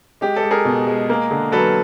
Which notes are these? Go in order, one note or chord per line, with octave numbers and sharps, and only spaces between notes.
G#3 G4
G4 A4
G#3
G#4 A#4
B2
G#3
A#3
D3
F#3 A4 B4